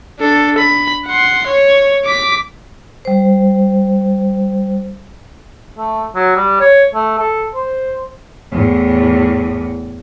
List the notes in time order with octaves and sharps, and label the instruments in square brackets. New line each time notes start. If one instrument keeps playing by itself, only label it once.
[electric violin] D4 A4
B5
F#5 C6
C#5
D6 B6
[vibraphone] G3 C5
[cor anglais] A3
F#3
G3
C#5
A3
A4
C5
[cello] E2 A2